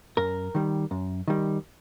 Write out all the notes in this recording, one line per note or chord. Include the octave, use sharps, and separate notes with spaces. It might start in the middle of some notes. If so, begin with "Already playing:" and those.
F#2 A#4
D#3 G3
F#2
D#3 G3